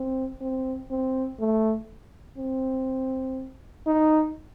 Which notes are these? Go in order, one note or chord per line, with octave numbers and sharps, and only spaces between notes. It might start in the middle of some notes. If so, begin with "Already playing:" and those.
Already playing: C4
C4
C4
A3
C4
D#4